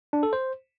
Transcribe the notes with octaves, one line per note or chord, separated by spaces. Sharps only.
D4
A4
C5